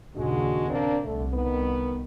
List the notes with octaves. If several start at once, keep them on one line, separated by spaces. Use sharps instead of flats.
D#2 A#2 C#3 G#3 D4 F#4
A#3 C4 D4
C2 D3 A3
D#3 B3